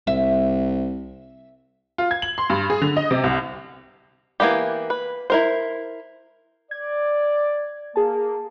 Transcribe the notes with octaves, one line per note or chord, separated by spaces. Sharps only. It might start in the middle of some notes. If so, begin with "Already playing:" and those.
C2 E5
F4
G#6
F#7
C6
G2
G#4
D3
D#5
C3
C2
E3 A#3 B3 G4
B4
E4 A#4 C5
D5 G#6
A#3 G#4 A5